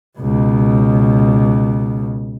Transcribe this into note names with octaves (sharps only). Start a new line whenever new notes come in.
C#2 B2